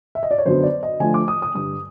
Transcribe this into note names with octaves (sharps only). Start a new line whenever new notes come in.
E5
D#5
D5
C#5
F#2 D3 F#3 B3 C5
D5
D#5
D3 F3 A3 D4 G#5
D6
D#6
D#6
G2 D3 G3 D#6